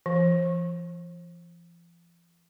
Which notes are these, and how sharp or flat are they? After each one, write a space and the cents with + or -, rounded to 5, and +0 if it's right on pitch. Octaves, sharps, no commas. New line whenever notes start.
F3 -45